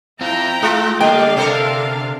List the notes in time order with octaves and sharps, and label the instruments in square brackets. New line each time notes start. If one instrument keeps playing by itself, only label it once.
[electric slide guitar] C4 F4 [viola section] E4 G5 A#5
[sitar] G#3 F4 [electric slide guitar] A3
[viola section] D3 D4 F5 [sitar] G3 [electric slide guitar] A#3 [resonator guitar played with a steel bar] G5
[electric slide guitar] C3 [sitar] C4 A4 A#4